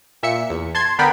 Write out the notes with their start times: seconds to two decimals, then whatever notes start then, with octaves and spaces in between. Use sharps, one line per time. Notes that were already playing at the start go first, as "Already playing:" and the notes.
0.23 A#2 E5 C#7
0.50 E2
0.75 A5 C6 G#6
0.99 D3 B3 A#4 G5 B5